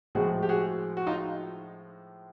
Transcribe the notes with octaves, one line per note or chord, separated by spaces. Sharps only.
A2 F3 G#3 F#4 G#4
G4
F#4 G#4
F#4
D#4 F4